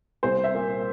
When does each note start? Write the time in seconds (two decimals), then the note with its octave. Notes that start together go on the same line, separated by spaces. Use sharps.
0.23 C2 C5
0.44 E5
0.54 A#2